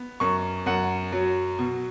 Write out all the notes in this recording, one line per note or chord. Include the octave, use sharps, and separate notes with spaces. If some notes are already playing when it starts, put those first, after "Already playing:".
Already playing: B3
F#2 C#6
F#2 F#5
F#3
B2